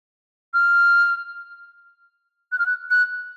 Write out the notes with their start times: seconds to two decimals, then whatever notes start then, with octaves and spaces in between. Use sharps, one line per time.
0.54 F6
2.52 F#6
2.59 F6
2.66 F#6
2.91 F#6